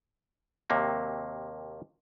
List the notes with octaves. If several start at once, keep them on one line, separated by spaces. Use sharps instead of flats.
D#2 C3 F#3 A#3 C4